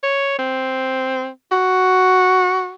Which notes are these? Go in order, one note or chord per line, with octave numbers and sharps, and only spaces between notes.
C#5
C4
F#4